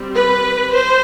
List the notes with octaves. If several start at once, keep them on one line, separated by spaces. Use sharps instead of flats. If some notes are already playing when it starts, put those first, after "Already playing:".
Already playing: G3 C4
B4
C5